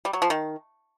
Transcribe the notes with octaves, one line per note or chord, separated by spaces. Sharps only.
G3
F#3
F3
D#3